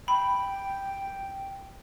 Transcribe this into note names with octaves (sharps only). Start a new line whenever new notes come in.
G5 B5